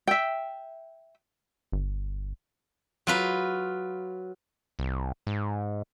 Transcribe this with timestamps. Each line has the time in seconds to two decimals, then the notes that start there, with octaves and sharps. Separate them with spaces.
0.07 E5 G5
1.72 G1
3.07 F#3 F4 B4
4.79 C2
5.27 G#2